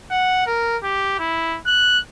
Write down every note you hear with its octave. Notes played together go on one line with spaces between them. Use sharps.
F#5
A#4
G4
E4
F#6